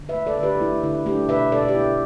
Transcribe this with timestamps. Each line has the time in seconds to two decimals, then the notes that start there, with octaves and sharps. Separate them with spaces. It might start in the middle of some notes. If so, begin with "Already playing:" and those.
Already playing: D3
0.09 B4 E5
0.14 A3
0.27 A4 D5
0.38 D3 G4 B4
0.61 A3 E4
0.83 D3 E4
1.06 A3 D4 G4
1.28 B2 B4 E5
1.52 B2 A4 D5
1.68 G4
1.74 B3 E4